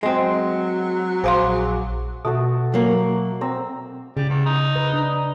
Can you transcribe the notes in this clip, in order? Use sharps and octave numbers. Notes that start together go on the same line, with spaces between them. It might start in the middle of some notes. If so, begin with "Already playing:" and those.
F#3 G#3 C4
A#1 G#4 C5 F5 C6 D6
B2 A3 F#4 A4
F#3 A#3
C4 A#5 E6
C#3 G3
E2
D#4
B4
D4